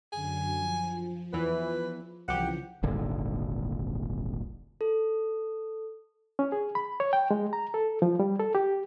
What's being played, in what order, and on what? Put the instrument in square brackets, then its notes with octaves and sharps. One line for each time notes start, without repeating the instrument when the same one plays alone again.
[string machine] F#2 D3 F#3 [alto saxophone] G#5
[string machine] F3
[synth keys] E2 E3 [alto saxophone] B4
[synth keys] C2 G4 [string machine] C#3 E3 F3 [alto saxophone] F#5
[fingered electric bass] D#1 G#1 D3
[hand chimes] A4
[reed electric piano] C#4
G#4
B5
C#5
G5
G#3
A#5
A4
F3
G3
A4
G4